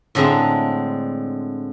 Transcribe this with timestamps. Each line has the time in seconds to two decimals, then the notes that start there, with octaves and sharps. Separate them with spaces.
0.15 A2 D3 G#3 C4 E5 A#5